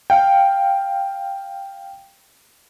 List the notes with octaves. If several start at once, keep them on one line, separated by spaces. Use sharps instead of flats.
F5 G5